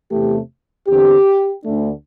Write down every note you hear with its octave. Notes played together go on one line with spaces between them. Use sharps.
E2 C3 E3 A3 G4
E2 D3 C4 G4
D2 D3 A3 D4